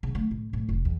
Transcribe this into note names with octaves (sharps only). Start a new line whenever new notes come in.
C#3
A3
A2
A2
F1
E2